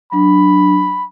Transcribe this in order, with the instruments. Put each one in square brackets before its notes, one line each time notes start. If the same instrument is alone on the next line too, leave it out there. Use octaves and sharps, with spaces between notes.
[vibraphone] F#3 D4 [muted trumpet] B5